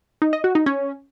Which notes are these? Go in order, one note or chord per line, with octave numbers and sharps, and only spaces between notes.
D#4
D#5
F#4
D#4
C#4